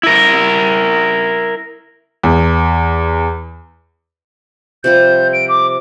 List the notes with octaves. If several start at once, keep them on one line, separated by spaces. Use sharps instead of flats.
E4 A#4
E2
C3 F3 G3 G6
D7
D6